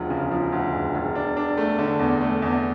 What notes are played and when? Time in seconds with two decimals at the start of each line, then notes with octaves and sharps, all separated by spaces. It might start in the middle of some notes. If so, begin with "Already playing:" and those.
Already playing: E1 D2 F3
0.10 C#3
0.31 F3
0.52 D2
0.73 E1
0.95 E1
1.15 D4
1.37 D4
1.57 A3
1.79 D3
1.99 E2
2.21 A3
2.42 E2